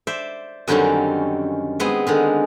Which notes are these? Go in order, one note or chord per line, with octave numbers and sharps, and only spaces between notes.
C5 D5 E5
F#2 D3 D#3 G3 C4 C#4
G#3 B3 C4 G#4
D3 D#3 G#3